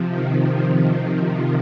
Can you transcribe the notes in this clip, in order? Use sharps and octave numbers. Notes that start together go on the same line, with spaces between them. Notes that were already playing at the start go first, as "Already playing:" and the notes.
Already playing: C3 F3
D#3